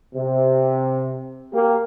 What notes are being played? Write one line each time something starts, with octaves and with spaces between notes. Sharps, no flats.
C3
A#3 G4